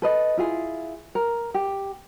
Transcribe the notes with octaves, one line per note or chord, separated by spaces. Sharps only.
A4 B4 D#5
E4 F4 G#4
A#4
G4